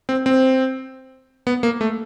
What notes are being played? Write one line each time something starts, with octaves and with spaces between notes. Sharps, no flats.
C4
C4
B3
A#3
A3